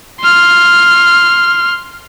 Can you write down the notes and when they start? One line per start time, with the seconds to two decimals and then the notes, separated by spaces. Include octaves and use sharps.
0.21 C6 F6